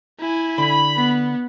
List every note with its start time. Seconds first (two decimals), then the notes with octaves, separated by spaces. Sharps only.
0.19 E4 G#5
0.58 D3 B5
0.96 B3